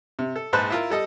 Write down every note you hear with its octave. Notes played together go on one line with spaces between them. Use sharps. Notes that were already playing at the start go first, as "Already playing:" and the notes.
C3
A4
A#1 G#2 B4 C5 A5 F#6
E4 F4 A#4
G3 A4 D#5